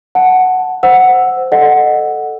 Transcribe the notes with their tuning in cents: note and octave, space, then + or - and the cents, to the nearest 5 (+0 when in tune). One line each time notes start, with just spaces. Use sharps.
F#5 +0 A5 +0
C5 -10 F#5 +0 E6 +0
A4 +0 D#5 -30 F#5 +0